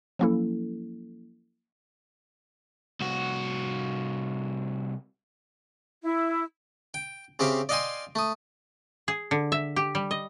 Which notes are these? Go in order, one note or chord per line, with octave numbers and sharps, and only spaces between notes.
F3 F#3 A#3 C#4 E4 A4
C2 F#4
E4
G5
C#3 C4 G4 E5 F5
D5 D#5 F5 G5 G#5 C6
A3 D#6
G#4
D3
E5
G4
G3
D#5